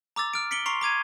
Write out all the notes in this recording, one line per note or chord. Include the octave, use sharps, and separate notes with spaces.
A#5 D6 E6 A6
F6 D7
B6 C#7 D7 F#7 G7
A#5 C6 C#6 C7 F7
A#5 D6 G#6 D#7